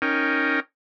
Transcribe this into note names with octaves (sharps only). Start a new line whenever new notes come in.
C#4 D#4 A#4 G5